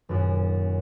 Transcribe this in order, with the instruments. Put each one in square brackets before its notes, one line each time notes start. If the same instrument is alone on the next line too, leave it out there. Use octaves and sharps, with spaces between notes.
[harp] D#1 F#2